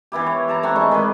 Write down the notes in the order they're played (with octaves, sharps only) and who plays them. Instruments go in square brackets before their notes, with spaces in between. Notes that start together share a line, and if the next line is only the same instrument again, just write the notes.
[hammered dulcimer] E3 B3 E4 G4
C#5
G4 A5 A#5
A3 C4 F#5 C#6
G3 G#3 D#4 E4
D#3 G#3 G4 B4